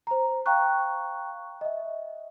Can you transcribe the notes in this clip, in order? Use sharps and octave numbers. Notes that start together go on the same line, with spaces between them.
C5 A#5
F5 G5 A#5 C#6 F#6
D#5 E5